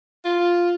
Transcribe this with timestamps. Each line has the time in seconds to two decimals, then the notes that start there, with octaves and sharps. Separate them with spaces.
0.25 F4